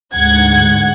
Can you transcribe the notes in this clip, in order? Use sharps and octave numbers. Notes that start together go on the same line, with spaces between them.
D2 G#2 F#5 G#6